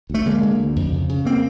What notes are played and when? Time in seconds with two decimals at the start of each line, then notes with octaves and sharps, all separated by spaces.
0.10 D2 A3
0.26 D3 G#3 A#3
0.43 D3
0.59 D2
0.76 F2
0.92 C#3
1.09 C#3
1.25 A#3 C4